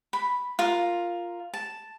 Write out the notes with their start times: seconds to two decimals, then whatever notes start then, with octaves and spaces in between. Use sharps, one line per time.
0.13 B5
0.59 F4 A#4
1.54 A5